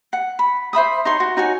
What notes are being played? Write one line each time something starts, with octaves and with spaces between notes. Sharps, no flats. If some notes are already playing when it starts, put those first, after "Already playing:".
F#5
B5
C5 E5 B5 D#6
D#4 C#5 C6
F#4
D#4 F#4 C#5 G#5